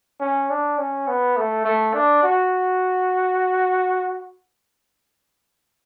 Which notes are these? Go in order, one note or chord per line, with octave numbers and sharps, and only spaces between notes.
C#4
D4
C#4
B3
A3
A3
D4
F#4